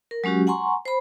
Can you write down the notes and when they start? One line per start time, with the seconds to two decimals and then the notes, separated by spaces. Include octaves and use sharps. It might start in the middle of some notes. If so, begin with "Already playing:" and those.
0.11 A#4
0.24 F#3 G#3 C#4 F#4 G4
0.47 F#5 G#5 A#5 C6 C#6
0.85 C5 B5